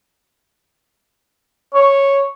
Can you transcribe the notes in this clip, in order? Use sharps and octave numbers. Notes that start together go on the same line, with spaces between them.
C#5